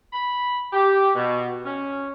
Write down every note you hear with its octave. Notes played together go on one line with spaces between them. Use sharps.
B5
G4
B2
C#4